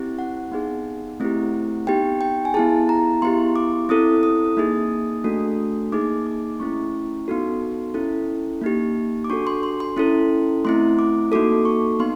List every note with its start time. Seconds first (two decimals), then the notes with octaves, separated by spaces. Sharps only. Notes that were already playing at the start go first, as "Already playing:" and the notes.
Already playing: C4 E4 G4
0.19 F#5
0.52 B3 D#4 G#4
1.20 A3 C4 E4 G4
1.87 B3 D#4 G4 G5
2.21 G5
2.45 G#5
2.54 B3 E4 G#4 A5
2.89 A#5
3.22 B3 E4 G4 C6
3.56 D6
3.89 C4 E4 A4 D#6
4.23 D#6
4.57 A#3 D#4 G#4
5.24 A3 D4 F#4 A4
5.92 A#3 D#4 G#4 D6
6.27 D6
6.60 A3 C#4 E4 C#6
7.28 B3 D#4 F#4 A4
7.94 C#4 E4 A4
8.62 A#3 D#4 G4
9.24 D6
9.30 D4 F#4 A4 C#6
9.47 C6
9.63 C6
9.80 C6
9.97 C#4 E4 A4
10.65 A3 C4 E4 C6
10.99 D6
11.32 A#3 D#4 F#4 A4 D6
11.65 C#6
12.00 B3 D#4 C6